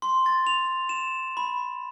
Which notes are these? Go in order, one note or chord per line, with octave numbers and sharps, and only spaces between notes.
C6
A6
F7
E7
B5